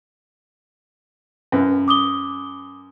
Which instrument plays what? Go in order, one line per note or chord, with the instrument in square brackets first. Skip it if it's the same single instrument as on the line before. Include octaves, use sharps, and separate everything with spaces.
[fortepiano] F#2 B4
[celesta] D6 D#6 G7